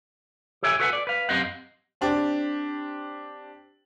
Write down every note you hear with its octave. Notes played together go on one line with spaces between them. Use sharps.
G4 A4 C#5 E5 G5 G#5
F#4 A4 B4 D#5 F#5 G#5
D5
B4 F5
F#2 C4 G4 D#5 F5 F#5
C4 D4 G4